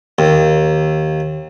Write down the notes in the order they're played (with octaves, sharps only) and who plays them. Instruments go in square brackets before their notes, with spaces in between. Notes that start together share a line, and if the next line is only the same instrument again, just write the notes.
[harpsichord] D#2